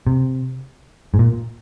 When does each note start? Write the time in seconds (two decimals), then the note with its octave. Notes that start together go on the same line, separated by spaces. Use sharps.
0.07 C3
1.14 G#2
1.19 A#2